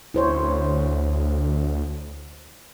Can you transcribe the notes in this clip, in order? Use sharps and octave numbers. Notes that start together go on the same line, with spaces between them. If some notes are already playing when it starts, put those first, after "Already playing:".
D2 E4 C5 C#5